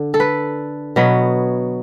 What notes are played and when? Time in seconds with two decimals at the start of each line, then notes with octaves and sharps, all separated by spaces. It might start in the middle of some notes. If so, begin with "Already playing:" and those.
Already playing: D3
0.14 A4
0.20 B4
0.96 B2 F#3 B3